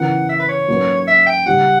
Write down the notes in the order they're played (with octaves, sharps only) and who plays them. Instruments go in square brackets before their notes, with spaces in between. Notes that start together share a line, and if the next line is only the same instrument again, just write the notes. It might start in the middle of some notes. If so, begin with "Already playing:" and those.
Already playing: [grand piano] C#3 E3 B3 E4 A#4 [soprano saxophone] F#5
[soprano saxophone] E5
B4
C#5
[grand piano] F#3 A#3 C#4 F#4 B4
[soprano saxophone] E5
G5
[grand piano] C#3 G3 C#4 G4 [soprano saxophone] F#5